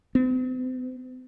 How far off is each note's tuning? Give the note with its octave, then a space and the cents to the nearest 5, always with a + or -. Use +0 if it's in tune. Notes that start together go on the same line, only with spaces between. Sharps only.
C4 -45